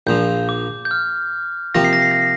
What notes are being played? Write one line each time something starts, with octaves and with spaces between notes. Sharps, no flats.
A#1 A#2 F3 G6
D6
G6
F6
C3 F3 A#3 F4 A#6
C7
A#6
C7
A#6
C7